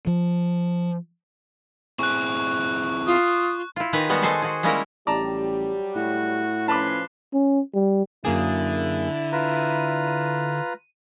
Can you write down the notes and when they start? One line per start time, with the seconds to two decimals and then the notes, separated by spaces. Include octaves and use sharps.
0.07 F3
1.99 C4 E4 G#4 C#6 F#6
3.07 F4 D#6
3.76 E4 F4
3.93 D#3 G4 B4 G#5 A#5
4.09 G3 G#3 B3 F#4
4.22 G#3 A4 C5 G#5 A5
4.42 F#4 G#4
4.63 G3 G#3 A#3 C#4 E4 A#4
5.07 A1 F#3 G3 G4 D5 A5 A#5
5.95 A2 F#4
6.68 F3 C#4 B4 A5 B5 C6 D6
7.34 C#4
7.74 G3
8.25 F#2 D3 A#3 E4 G#4
9.32 F4 B4 A#5 D#7